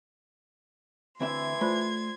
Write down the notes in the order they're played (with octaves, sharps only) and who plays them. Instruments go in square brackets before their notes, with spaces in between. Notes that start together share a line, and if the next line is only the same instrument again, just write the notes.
[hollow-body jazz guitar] D2 C4 E5 [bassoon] E3 [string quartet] C6 G#6
[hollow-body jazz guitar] A3 [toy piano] F4 C5 D5